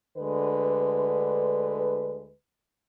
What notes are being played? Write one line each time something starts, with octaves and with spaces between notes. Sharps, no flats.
D2 D3 G#3 B4